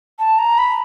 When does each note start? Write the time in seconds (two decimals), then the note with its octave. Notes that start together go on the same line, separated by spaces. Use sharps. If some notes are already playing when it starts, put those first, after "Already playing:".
0.19 A5
0.38 A#5
0.58 B5